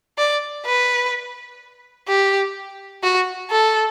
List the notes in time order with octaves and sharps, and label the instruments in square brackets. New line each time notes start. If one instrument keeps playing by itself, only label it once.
[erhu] D5
B4
G4
F#4
A4